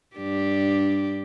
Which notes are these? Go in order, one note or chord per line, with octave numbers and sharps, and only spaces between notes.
G2 D4 G4